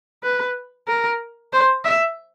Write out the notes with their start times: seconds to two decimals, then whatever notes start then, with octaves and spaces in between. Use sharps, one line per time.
0.23 B4
0.88 A#4
1.53 C5
1.85 E5